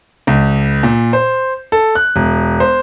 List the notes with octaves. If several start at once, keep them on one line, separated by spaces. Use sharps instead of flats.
C#2
A#2
C5
A4
F#6
E1
C5